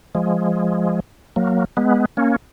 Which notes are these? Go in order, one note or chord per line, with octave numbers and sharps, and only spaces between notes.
F3 G#3
F#3 A#3
G#3 B3
A#3 C#4